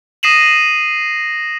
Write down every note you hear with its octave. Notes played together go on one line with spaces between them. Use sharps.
D#6 A#6 C7 D#7 E7 F#7